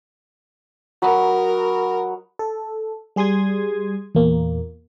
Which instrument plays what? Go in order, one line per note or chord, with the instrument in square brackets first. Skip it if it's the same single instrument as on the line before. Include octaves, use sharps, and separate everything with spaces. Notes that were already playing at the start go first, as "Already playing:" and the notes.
[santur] F#3 D#5 B5 [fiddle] A#4
[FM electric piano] A4
G3 G#4 C6 D#6 G#6
E2 A#2 A#3